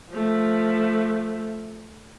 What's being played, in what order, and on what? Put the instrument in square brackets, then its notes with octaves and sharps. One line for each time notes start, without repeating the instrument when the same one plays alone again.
[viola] F3 A3